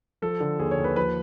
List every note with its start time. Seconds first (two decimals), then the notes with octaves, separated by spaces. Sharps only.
0.22 F3 A4
0.40 D3
0.59 D#2 G#4
0.71 C#5
0.78 D#2
0.84 B4
0.96 F3 B4